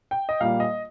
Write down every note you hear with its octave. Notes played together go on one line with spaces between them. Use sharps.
G5
D#5
A#1 A#2 G3 A#3 F5
D#5